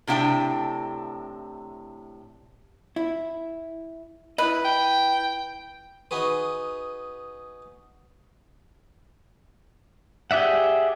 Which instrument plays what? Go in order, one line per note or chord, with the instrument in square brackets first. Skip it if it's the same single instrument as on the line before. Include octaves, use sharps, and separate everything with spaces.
[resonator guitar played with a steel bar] A2 C3 D4 F5 G5 A5
[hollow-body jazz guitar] E4
[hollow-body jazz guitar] E4 D#5 [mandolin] B4
[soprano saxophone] G5
[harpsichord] D#4 F#4 G#4 B4
[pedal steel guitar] G4 G#4 D5 E5 F#5